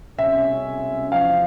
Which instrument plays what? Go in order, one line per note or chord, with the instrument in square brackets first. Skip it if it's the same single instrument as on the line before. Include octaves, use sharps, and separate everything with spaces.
[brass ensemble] C2 B2 G#3 C#4 [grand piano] E5
[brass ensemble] E2 C3 F3 [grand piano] F5